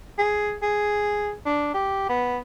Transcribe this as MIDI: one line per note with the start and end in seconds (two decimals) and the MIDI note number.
0.18 0.55 68
0.63 1.32 68
1.46 1.70 62
1.74 2.06 67
2.09 2.38 59